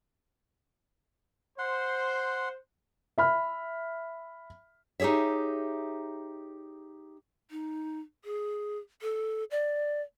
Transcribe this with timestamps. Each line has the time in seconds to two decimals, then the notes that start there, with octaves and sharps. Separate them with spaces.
1.59 C5 F#5 C6
3.18 E5 B5 F6
5.00 D#4 G4 G#4 C#5 E5
7.51 D#4
8.25 G#4
9.02 A4
9.51 D5